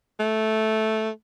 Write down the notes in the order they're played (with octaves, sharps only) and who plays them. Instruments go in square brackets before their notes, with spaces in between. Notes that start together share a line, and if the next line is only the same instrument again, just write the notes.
[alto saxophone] A3